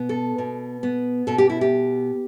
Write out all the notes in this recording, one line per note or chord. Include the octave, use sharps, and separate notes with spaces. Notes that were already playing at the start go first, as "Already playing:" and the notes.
Already playing: B2 B3
A4
B2
B3
B2 A4
G4
E4
G4